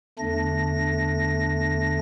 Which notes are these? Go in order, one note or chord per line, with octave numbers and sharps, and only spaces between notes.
E2 D3 A3 D4 A#6